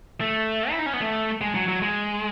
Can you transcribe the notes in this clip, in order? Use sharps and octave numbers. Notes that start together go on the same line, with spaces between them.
A3
E4
D#4
C#4
B3
A3
G#3
F#3
F#3
G#3